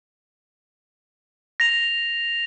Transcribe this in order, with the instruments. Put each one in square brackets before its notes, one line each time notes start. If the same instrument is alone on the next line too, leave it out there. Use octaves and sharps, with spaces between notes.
[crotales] A#6 F7